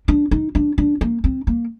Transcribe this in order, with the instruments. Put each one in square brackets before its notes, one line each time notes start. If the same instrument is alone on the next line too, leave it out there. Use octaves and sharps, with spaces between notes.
[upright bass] D4
D#4
D4
D4
A#3
C4
A#3